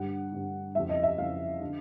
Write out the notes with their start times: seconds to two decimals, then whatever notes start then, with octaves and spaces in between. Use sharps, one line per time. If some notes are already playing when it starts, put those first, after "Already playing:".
Already playing: G2 D3 F#5
0.32 G2 D3
0.75 F2 C#3 E3 E5
0.89 D#5
1.03 E5
1.18 F2 C#3 E3 F5
1.61 D3